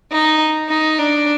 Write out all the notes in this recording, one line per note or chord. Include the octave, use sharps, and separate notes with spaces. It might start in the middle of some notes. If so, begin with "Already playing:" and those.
D#4
D#4
D4